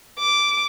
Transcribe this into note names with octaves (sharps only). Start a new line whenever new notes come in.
D6